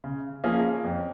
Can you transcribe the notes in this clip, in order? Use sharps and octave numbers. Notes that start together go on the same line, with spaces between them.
C#3
F3 A#3 C#4 G#4
F2